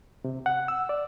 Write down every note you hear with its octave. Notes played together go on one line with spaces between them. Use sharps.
C3
F#5
E6
D5